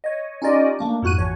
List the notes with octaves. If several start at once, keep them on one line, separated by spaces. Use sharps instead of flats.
C#5 D#5
C#4 D#4 F4 G4 D5 D#5
A3 A#3 D4
F2 G#2 F#4 F#6 D#7
A1 F#4 C#5